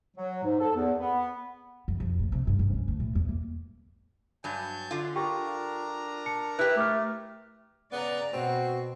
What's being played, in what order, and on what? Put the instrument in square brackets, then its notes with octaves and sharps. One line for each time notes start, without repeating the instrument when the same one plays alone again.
[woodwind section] F#3
G#2
A4
E2
B3
[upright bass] F2
F2
A2
C3
G2
G2
C#4
D2
A2
E2
A#3
[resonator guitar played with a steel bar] G2 F#3 [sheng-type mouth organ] G#5 A5 G6
[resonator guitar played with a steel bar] D3 F4
[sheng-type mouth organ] D4 A#4 A#5 [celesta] G4 G5 C#6
[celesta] A5 C#7
[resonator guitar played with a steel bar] E4 G4 [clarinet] B4 [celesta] F#6
[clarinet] A3 [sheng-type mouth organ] A#4 [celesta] D6 F6
[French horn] C#3 [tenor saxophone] B3 [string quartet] D5 A#5
[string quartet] B2 [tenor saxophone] C4 [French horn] F#4